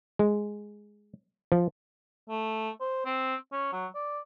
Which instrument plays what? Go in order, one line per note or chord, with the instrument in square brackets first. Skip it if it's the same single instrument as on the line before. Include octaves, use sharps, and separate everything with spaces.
[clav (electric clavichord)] G#3
F3
[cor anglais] A3
C5
C4
C#4
F#3
D5